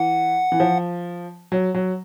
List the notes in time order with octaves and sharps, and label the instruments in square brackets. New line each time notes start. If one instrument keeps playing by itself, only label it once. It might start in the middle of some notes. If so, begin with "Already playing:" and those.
Already playing: [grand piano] E3 [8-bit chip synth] F#5
[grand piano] E3
F3
F#3
F#3